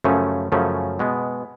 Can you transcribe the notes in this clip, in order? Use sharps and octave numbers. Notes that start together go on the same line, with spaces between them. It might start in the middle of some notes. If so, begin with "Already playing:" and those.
F#2 C#3 F3 A3 C#4
F#2 C#3 F3 A3 C#4
B2 G#3 B3